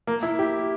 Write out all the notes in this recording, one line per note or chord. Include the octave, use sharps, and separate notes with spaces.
A#3
E4
G4